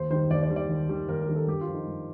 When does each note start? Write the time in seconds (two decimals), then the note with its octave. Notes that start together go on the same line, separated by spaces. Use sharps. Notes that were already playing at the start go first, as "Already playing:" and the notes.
Already playing: D#2 C5
0.10 D#3 G3 C5
0.31 D#2 D5
0.43 D5
0.50 D#3 G3
0.56 D5
0.69 D#2
0.89 D#3 G3
1.08 D#2 A#4
1.22 A#4
1.28 D#3 G3
1.35 A4
1.47 G2 G4
1.61 F4
1.67 F3
1.74 D#4
1.87 G2